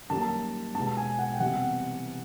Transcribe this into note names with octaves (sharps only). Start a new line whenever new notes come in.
F#2 D#3 G3 A#3 A5
B2 G#3 B3 A5
G#5
F#5
G5
C3 E3 G3 B3 F#5